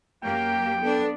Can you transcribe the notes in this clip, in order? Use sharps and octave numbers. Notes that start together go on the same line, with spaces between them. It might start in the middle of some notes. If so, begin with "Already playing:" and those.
F#2 A#3 G4 G5
B3 D4 A4